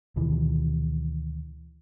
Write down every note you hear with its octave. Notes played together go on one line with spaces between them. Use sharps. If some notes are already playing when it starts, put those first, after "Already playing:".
D2 B2 D#3 E3